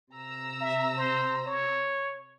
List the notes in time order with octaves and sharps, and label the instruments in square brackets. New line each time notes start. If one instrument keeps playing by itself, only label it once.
[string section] C3 A#5 E6
[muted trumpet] E5
C5
C#5